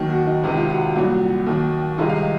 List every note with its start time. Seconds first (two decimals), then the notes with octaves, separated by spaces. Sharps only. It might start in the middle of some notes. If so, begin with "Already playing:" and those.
Already playing: D#2 D#3 F#3
0.10 F#4
0.27 D#4
0.44 C#2 C3 D#3 F#4
0.57 F4
0.70 F#4
0.96 C2 A#2 F#3
1.47 D#2 D#3 F#3
1.98 C2 C3 D#3 G#3 F4
2.09 F5
2.16 D#5